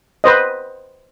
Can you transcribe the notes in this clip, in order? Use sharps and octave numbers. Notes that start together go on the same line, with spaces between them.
B4 C5 D#5